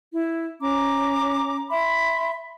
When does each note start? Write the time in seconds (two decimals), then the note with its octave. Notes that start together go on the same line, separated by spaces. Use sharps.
0.14 E4
0.61 C#4 A#5 D6
1.70 E5 B5 C6